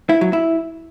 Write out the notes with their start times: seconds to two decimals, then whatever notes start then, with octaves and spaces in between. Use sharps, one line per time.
0.09 E4
0.21 F#3
0.33 E4